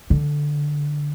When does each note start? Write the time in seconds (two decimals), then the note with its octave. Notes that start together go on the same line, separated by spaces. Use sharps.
0.10 D3